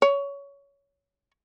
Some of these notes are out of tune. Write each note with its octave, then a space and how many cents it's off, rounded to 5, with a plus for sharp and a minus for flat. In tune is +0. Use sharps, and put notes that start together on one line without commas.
C#5 +20